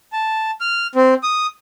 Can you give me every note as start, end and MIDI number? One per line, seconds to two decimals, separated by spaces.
0.13 0.51 81
0.61 0.87 89
0.95 1.14 60
1.23 1.47 87